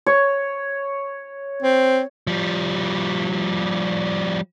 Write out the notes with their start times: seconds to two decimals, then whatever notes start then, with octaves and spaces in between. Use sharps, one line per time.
0.06 C#5
1.62 C4
2.27 F3 G3